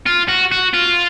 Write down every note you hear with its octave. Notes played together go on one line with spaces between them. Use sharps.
F4
F#4
F#4
F4